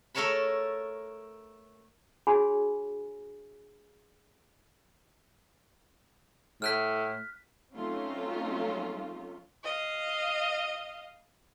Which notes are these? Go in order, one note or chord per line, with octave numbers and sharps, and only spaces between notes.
A3 A4 A#4 C#5 A5 B5
D4 F#4 G#4 C#5 G#5 B5
A2 F6 F#6 B6
F#3 A3 C4 C#4 D#4 F4
D#5 F5